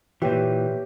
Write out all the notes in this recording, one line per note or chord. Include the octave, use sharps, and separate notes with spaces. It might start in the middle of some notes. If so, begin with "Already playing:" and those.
A#2 E3 G4 B4 C#5 E5